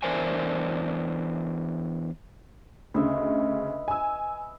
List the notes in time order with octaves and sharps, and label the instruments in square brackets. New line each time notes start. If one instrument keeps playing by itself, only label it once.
[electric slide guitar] E2 D4 A#4 C5 E5 G#5
[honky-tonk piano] D2 C#3 [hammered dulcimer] B4 D#5 E5
[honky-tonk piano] G#5 E6